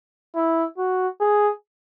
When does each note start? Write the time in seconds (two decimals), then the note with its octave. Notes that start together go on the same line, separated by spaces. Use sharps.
0.35 E4
0.78 F#4
1.21 G#4